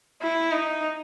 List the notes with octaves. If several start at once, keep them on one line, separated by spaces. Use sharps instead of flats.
E4
D#4